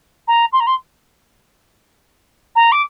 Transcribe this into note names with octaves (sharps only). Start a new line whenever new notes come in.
A#5
C6
A#5
C6
A#5
D6